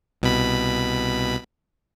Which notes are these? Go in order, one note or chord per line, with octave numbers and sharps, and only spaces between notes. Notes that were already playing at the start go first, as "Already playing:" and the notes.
C2 B2 B5